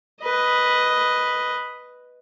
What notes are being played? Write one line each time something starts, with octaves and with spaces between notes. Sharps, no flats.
B4 D#5